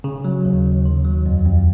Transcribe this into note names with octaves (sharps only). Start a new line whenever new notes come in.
C#3
F#3
D#2
D#2
D#3
F#3
F2
F2